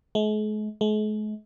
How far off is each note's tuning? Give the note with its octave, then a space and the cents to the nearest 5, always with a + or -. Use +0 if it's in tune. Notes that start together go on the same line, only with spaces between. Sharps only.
G#3 +45
G#3 +45